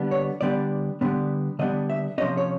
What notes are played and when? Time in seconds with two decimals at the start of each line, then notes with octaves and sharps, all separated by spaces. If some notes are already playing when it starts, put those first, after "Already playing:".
Already playing: D3 G3 B3 D4
0.11 C#5
0.41 D3 G3 B3 D4 D5
1.01 D3 G3 B3 D4
1.59 D3 G3 B3 D4 D#5
1.90 E5
2.18 C3 F3 A#3 C#4 D#5
2.37 C#5